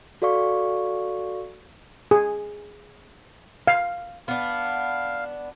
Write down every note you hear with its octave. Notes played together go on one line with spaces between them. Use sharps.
F#4 A4 D5 F5 C#6
G#4
F5
B3 D4 F5